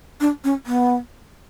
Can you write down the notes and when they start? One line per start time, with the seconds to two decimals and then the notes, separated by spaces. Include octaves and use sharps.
0.20 D4
0.44 C#4
0.66 B3